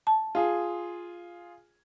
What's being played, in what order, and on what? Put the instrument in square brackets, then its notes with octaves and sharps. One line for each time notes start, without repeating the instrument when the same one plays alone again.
[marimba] A5
[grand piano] F4 G#4